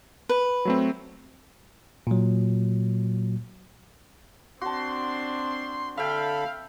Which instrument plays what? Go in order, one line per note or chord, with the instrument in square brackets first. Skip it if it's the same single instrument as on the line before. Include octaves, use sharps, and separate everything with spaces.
[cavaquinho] B4
[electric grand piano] F#3 A3 C4
[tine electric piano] A#2 F#3
[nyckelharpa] C4 D4 [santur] F#4 A5 [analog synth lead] C6
[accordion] D3 A4 B5 [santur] E5 G5 [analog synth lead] F5